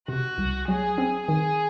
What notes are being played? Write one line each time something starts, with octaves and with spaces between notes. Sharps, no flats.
C3 F#4
C2
F#3 G#4
C4
D#3 G#4